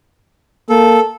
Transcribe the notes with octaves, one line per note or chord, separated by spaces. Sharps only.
A#3 A4